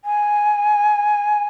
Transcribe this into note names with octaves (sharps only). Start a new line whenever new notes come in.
G#5